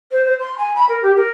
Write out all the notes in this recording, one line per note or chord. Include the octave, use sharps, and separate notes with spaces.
C5
C5
C6
G#5
B5
A#4
G4
A#4